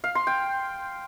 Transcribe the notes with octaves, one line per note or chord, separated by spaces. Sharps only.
F5
C6
G5